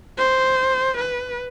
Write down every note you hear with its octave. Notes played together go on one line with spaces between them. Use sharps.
C5
B4